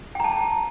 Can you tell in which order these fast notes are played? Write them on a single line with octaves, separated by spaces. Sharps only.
G5 A#5 A5